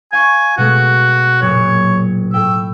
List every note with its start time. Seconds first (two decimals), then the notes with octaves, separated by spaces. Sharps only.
0.13 F5 G#5 C#6 G6
0.58 B2 G#3 A3 F#4
1.42 F#1 A#2 C#5
2.34 A2 G5 E6